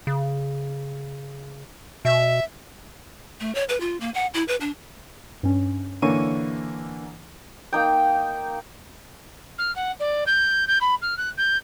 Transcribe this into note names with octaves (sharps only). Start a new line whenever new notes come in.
C#3
B2 E5
A3
C#5
B4
F4
A#3
F#5
E4
B4
D4
G2 C#4
D3 E3 A#3 C#5 C#6 D#7
A#3 D#4 G5
F6
F#5
D5
G6
G6
B5
F6
F#6
G6